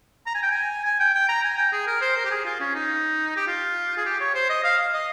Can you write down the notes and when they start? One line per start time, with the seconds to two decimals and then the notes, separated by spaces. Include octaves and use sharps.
0.26 A#5
0.35 G#5
0.43 G5
0.51 G#5
0.85 G#5
1.00 G5
1.15 G5
1.29 A#5
1.44 G#5
1.58 G5
1.72 G#4
1.87 A#4
2.01 C5
2.17 A#4
2.24 G4
2.31 G#4
2.45 F4
2.60 C#4
2.75 D#4
3.36 G4
3.47 F4
3.97 G#4
4.06 G4
4.20 C#5
4.35 C5
4.49 D#5
4.64 F5
4.93 D#5